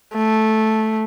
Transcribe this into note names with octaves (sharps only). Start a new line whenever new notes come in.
A3